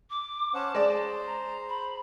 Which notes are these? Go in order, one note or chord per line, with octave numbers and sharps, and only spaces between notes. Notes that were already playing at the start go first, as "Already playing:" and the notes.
D6
C#4 C5 F#5 A5
G#3 C5 D5
A#5
B5